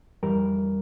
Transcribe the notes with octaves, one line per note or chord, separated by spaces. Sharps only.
F2 E3 G3 A#4